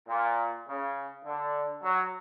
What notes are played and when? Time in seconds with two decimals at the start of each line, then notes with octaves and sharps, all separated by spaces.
0.08 A#2
0.67 C#3
1.25 D3
1.83 F#3